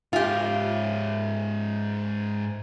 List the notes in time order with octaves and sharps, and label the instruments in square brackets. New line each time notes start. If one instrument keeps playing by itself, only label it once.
[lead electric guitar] G#2 E5 [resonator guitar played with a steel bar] F4 G4